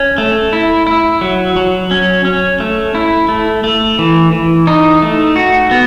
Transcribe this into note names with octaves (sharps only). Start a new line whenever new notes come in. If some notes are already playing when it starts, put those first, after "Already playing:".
Already playing: C#4
A3
E4
E4
F#3
F#3
C#4
C#4
A3
E4
A3
A3
E3
E3
D#4
A3
F#4
B3